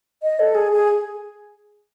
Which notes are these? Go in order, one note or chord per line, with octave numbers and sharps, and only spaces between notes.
D#5
A4
G#4
G#4